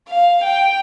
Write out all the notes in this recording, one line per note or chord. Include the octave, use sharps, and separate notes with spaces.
F5
G5